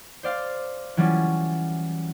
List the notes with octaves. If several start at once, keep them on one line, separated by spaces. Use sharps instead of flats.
C5 D5 F5
E3 F#3 G3 C#4 F4